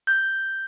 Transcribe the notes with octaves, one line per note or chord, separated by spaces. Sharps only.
G6